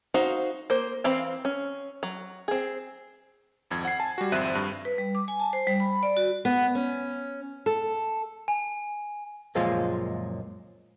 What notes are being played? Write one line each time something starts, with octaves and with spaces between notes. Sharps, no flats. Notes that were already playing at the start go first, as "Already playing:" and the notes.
D#4 F#4 C5 F5
A#3 C5
E3 C4 F5 B5
C#4
F#3
C4 G#4
G#1 F2 G#6
F#5 C7
G#5 A5
G3 F#4
G#1 F2 C4 E5 F#6 D#7
G2
B4
G3
D6
G#5
A5
C5
G3
B5
D5
F#4
B3
C#4
A4
G#5
C#2 F#2 A#2 F3 G#3 F5